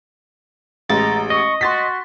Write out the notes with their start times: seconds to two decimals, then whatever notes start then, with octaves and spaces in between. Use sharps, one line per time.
0.90 A1 G#3 A#5 A6
1.30 D#5 C#6
1.61 F#4 C6 A6 B6